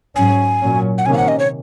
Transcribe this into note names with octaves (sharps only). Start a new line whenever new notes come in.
G#2 F#3 C#4 G#5
A#2 F#3 C#4
F#5
C3 D#3 A#3 C#4 G#5
F5
F#5
D#5
C#5